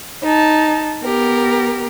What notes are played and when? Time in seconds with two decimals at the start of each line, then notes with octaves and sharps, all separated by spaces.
0.23 D#4 A5
1.03 B3 G4 A#4